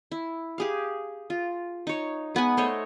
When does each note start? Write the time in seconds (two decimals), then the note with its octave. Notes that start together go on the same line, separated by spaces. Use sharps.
0.11 E4
0.58 G4 G#4 F5
1.30 F4
1.87 D#4 C#5
2.35 G#3 B3 F#5 G#5
2.57 A3 C5 C#5 D#5